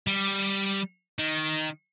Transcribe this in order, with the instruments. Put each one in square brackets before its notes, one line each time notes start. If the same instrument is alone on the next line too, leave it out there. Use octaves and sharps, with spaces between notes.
[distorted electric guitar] G3
D#3